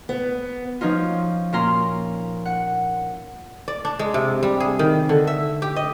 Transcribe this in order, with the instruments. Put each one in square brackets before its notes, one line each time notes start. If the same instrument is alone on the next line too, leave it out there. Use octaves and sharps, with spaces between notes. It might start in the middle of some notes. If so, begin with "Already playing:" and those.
[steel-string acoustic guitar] B3
[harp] F3 C#4 D#4 F4
A#2 C#4 F4 A#5 C6
F#5
[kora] D5
D4
G#3
C3
G3
G#4
D#3
D3
E5
G4
D#5